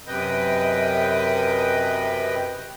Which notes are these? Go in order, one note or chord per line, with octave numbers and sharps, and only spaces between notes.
F#2 C3 B4 D#5 G5